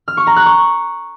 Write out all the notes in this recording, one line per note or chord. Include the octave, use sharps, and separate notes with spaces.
F6
C#6
A#5
F#6
C#6